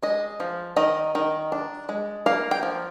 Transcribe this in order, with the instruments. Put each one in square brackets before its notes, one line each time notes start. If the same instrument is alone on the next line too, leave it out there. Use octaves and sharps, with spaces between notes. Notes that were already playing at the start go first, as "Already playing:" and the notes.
[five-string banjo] G#3 D#5
F3
D#3 D#5
D#3
D4
G#3
A#3 F5
G5
F3